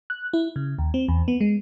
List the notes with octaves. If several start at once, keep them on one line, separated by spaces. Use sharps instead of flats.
F#6
E4
C#3
D#2
C4
E2
B3
G#3